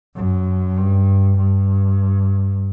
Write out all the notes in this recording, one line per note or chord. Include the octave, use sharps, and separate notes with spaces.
F#2
G2
G2